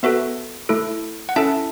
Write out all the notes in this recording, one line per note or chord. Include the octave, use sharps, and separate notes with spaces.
B3 F#4 A4 B4 E5
A3 E4 A4
F#5
C#4 E4 A4 E5 A5